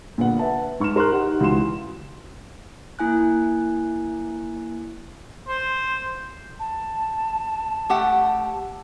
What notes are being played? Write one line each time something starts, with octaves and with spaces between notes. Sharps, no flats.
A#2 D3 B3 F#5
B4 E5 A5
G#2 C#6 F6 E7
A#4 C6 F6 F#6
D#4 G4 F#5
C#2 E3 F#4 C6 E7
A#3 E4 G#5 F#6
C5
A5
A3 G4 F#5